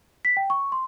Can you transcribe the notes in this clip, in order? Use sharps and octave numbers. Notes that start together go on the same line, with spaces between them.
B6
G5
C#6
C6